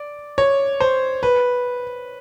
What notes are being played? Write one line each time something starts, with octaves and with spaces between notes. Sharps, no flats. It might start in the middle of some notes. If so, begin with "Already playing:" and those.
Already playing: D5
C#5
C5
B4